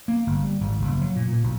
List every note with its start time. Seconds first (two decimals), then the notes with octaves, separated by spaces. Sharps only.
0.08 A#3
0.27 G1
0.43 G3
0.61 G#1
0.82 F#1
1.01 F#3
1.16 A#2
1.28 A#2
1.44 B1